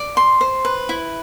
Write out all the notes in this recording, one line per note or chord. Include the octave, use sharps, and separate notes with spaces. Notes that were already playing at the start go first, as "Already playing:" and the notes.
Already playing: D5
C6
C5
B4
E4